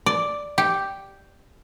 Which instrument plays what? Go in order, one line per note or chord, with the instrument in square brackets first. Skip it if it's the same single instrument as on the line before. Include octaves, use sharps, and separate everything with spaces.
[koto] D5
G4